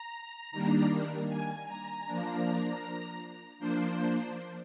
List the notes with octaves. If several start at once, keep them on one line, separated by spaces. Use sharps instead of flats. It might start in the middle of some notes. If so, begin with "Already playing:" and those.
Already playing: A#5
D#3 G3 A#3 D4
G#5
A#5
F3 A#3 D4
F3 A#3 D4 C5